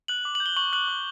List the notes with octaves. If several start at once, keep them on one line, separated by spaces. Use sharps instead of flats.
F#6 F#7
D6
F#7
G6
G7
C#6 F#7
F#6 F#7
D6